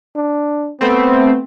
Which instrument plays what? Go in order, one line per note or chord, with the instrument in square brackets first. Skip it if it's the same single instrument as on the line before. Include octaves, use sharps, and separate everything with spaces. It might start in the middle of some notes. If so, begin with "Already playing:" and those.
[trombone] D4
[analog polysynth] A3 C4 [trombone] B3